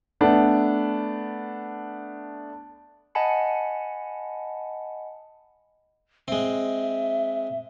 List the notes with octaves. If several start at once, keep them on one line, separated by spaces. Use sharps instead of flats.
A3 B3 D4
D#5 F#5 G#5 A5 B5 C#7
G#3 C4 E5